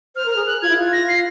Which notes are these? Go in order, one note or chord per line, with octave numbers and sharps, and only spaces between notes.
C5 F6
A#4 F6
G#4
F#6
F4 G#6
E4
F4
A#6
C7